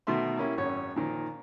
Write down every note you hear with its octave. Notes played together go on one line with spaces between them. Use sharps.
B2 D#3 A3 E5 C6
A#3 C#4 E4 G4
G#1 F#2 C#4 C#5
A#2 D#3 F3